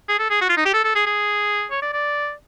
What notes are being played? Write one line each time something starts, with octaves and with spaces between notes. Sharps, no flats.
G#4
A4
G#4
F#4
F4
D#4
G4
A4
A4
G#4
G#4
C#5
D5
D5